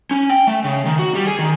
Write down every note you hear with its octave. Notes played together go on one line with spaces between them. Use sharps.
C#4
G5
A3
C#3
D#3
F#4
G3
G#4
D#3